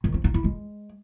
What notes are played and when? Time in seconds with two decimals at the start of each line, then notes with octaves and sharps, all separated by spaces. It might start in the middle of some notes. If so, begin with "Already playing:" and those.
0.04 D#3
0.14 C4
0.24 D#4
0.34 E4
0.44 G#3